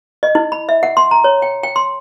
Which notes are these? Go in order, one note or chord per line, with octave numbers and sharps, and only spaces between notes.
D#5
E4
B5
E5
F#5
C6
A#5
C#5
G5
G5
C6